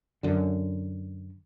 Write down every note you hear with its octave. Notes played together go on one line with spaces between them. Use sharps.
F#2 D3